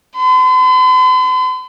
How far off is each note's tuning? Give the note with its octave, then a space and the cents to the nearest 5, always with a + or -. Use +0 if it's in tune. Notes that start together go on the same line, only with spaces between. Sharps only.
C6 -45